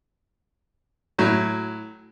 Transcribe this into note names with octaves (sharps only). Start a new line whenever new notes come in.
A2 F#3